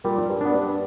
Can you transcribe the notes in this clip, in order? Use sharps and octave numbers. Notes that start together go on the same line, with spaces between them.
A#2 G3
G2
B3 D4
G2